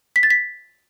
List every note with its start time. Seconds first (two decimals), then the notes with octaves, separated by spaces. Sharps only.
0.16 B6
0.23 A6
0.30 B6